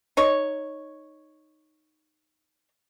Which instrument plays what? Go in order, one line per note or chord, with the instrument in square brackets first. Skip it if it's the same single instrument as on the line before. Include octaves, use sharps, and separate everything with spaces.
[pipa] D#4 C#5